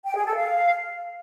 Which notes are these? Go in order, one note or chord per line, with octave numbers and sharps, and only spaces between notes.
G5
G#4
A4
F5